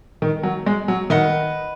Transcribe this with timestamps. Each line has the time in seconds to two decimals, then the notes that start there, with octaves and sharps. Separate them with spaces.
0.22 D#3
0.43 F#3
0.66 G#3
0.88 F#3
1.10 D#3 B4 D#5 F#5